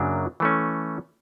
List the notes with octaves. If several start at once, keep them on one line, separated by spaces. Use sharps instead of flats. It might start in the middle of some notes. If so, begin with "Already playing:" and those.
Already playing: F#2 C#3 F#3 A#3 D4
E3 A3 C#4